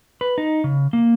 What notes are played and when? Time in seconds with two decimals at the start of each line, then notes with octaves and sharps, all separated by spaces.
0.21 B4
0.38 D#4
0.64 C#3
0.93 A#3